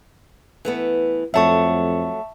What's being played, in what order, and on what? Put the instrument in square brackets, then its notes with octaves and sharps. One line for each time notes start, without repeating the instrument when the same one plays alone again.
[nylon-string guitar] E3 A3 B3
[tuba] F2 [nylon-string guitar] F#3 A3 [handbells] E5 A5 C#6